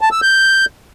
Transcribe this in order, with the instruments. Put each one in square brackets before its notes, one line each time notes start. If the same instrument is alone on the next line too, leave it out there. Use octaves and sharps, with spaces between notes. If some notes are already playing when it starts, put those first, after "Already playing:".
[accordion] A5
E6
G6